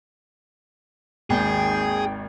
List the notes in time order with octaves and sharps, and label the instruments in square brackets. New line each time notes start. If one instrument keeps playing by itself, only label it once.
[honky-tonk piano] G#1 D#2 [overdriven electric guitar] G#4 [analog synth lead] G5